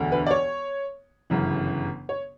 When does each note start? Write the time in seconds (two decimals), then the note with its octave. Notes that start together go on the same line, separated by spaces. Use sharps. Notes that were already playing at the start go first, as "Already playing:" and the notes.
Already playing: E1 D2 D3
0.12 B4
0.27 D5
0.31 C#5
1.30 G1 F#2 C#3 E3
2.09 C#5